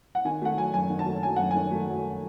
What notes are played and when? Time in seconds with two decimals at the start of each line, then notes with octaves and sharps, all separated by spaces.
0.15 F#5
0.25 D#3 G#5
0.42 A3 F#5
0.58 F#3 G#5
0.74 F#2 G#5
0.90 D#3
0.99 A5
1.06 A3
1.23 F#3 G#5
1.36 F#2 F#5
1.51 D#3 G#5
1.71 A3
1.88 F#3